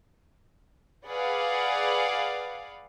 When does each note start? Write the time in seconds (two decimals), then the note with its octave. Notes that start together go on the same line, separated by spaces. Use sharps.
1.07 G#4 B4 D5 F5 F#5